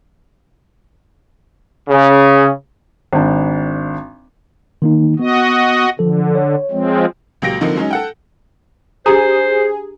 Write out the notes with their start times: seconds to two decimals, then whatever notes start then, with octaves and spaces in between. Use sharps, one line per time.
1.88 C#3
3.13 G#1 D4
4.82 D#3 A#3 D#4
5.19 B3 F#4 D#5
5.99 D3 F3 A4
6.35 C#5
6.71 F3 G#3 C4
7.42 C#2 A#2 F#3 G4 A#6 D7
7.61 D3 D#3 F3 A#3 C4 D#4
7.76 F#3 G#3 C#4 D#4
7.91 A4 F#5 G5
9.06 D4 G4 G#4 C5 A#5